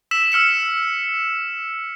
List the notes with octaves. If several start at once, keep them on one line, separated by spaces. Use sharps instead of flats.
E6 B6 E7
E6 F6 C#7 E7